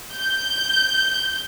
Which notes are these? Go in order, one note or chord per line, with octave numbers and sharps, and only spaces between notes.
G6